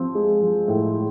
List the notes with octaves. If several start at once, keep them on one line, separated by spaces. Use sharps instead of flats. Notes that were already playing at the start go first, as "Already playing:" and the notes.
Already playing: F3 C4
G#3
F3
A2
G#3